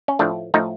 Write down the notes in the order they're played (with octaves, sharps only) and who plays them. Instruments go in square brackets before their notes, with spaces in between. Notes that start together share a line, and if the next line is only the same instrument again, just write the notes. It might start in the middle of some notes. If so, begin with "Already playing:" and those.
[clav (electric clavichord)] C#4
A2 F3 A3 D4
A2 F3 A3 D#4